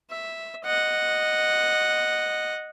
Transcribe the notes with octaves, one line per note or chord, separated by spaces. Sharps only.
E5
D#5 F#5